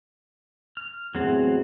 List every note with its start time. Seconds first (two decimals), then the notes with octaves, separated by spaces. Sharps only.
0.77 F6
1.15 E2 A2 F#3 C4 F#4 G#4